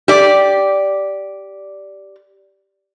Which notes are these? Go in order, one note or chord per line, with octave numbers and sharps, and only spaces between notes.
G4 D5